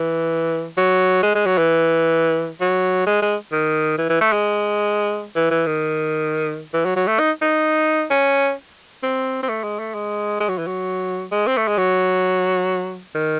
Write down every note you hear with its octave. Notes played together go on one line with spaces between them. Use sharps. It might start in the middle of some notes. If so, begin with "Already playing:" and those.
Already playing: E3
F#3
G#3
G#3
F#3
E3
F#3
G#3
G#3
D#3
E3
E3
A3
G#3
E3
E3
D#3
E3
F#3
F#3
A3
D#4
D#4
C#4
C4
C4
A3
G#3
A3
G#3
G#3
F#3
E3
F#3
G#3
C4
A3
G#3
F#3
D#3